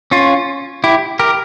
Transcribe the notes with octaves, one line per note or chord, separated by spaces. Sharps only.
C#4 F4
E4 G4
G4 A#4